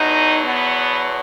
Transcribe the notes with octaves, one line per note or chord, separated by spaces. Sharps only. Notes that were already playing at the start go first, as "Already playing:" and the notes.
Already playing: E2 B2 F#3 D#4
B3